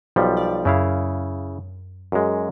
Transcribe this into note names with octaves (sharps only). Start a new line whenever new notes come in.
B1 F3 G3
D5
F#2 C#3 E4 F5
F#2 G#3